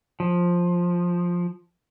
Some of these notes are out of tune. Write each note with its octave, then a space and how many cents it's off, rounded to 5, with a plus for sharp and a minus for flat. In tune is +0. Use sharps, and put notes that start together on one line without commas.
F3 +10